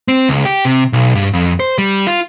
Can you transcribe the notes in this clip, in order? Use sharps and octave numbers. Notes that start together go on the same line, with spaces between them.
C4
C#2
G4
C3
B1
G2
F2
C5
G3
F4